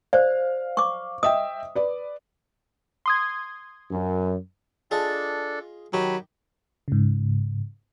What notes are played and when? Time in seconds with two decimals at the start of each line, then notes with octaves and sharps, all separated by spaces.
0.13 C5 D5 F5
0.77 C#6 D6
1.23 D#5 E5 G5 D#6
1.75 B4 D5
3.06 C6 D#6 G#6
3.91 F#2
4.91 D4 F4 G#4 A4 D5 D#5
5.93 D#3 F#3 G4 B5
6.88 G#2 C#3